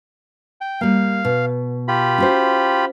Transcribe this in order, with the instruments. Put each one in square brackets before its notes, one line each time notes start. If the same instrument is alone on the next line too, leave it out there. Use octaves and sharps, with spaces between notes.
[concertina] G5
[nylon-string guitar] G3 A#3 [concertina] F5
[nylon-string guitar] B2
[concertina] F4 G4 B5
[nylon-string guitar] C#4 F#4 C5